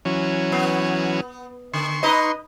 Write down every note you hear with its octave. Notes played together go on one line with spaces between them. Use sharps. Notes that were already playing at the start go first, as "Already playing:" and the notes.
E3 F#3 C#4
B3
D3 C6 C#6
D#4 B4 D#5